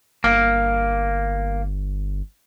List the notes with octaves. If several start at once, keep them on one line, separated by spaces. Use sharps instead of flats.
G1 A#3